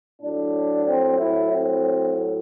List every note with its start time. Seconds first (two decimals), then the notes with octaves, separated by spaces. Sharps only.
0.21 A2 F#3 D4
0.87 C4
1.19 E4
1.52 C4